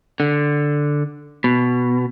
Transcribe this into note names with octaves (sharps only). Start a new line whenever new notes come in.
D3
B2